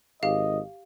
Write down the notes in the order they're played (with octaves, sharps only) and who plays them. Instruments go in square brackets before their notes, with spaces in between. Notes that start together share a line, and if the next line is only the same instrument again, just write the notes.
[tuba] G#1 [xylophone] G4 F5 [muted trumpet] D#5